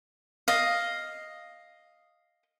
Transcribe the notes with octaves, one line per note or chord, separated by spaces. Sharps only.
D#5 F5